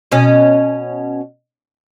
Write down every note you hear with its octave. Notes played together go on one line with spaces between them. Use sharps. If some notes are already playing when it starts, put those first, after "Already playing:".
B2 C#4